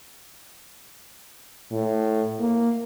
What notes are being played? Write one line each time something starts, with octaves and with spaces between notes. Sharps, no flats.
A2
A#3